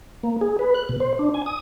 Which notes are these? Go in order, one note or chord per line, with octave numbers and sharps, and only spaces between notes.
A#3
G#4
B4
F#6
B2
C5
D4
G#5
D#6